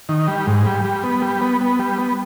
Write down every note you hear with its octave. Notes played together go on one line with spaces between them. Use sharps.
D#3
G3
G#2
G3
G3
B3
G3
B3
B3
G3
B3